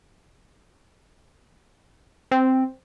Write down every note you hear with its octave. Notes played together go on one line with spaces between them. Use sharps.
C4